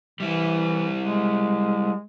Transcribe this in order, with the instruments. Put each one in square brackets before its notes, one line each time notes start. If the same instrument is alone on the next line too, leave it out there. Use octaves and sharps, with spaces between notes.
[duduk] E3 [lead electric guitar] G3 E4
[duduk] G#3